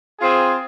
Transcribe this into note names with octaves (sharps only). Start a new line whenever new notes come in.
C4 F4 G#4